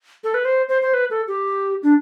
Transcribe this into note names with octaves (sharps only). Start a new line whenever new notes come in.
A4
B4
C5
C5
C5
B4
A4
G4
D4